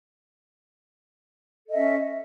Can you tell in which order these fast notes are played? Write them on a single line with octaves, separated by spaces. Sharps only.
A4 D#5 E5 C#4